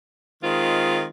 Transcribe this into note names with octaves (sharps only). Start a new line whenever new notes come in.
D#3 G#3 C4 F4